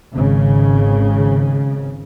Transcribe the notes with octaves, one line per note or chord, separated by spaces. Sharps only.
G#1 C#3